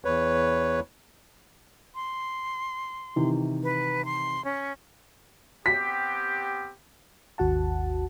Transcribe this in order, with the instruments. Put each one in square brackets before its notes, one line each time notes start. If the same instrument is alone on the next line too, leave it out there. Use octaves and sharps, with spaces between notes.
[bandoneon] E2 B4 C#5
[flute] C6
[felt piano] C3 D#3 E3
[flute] B4
C6
C#4
[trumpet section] B3 C4 G4 [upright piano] B6
[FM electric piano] G#1 D#2 F#4 F#5 A5